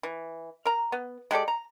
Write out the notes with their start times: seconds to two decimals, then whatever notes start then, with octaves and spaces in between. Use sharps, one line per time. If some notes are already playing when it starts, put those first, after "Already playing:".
0.03 E3
0.65 A#4 A#5
0.92 B3
1.31 G#3 G4 A4 D5
1.48 A#5